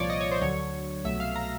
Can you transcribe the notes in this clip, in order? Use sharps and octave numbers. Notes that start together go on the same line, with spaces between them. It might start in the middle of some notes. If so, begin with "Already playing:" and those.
Already playing: C2 A#2 F3 C#5 D5
D#5
C#5
C5
D2 D3 F#3 C#5
C2 B2 F#3 A3 E5
F5
A#5